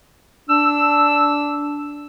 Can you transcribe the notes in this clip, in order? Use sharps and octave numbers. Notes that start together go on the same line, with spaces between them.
D4 E6